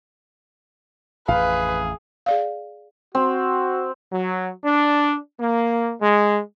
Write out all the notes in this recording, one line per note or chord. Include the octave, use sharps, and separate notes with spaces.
A1 F2 G#4 B4 F5
G#4 D5 F5
C4 F#4
F#3
D4
A#3
G#3